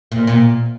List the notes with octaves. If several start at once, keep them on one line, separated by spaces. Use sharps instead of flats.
A#2
A#2